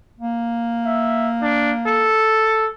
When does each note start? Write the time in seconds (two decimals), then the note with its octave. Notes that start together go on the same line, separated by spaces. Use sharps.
0.20 A#3
0.85 E5
1.42 D4
1.87 A4